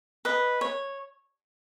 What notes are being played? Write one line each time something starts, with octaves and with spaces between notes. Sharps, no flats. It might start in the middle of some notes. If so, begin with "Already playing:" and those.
B4 D#5
C#5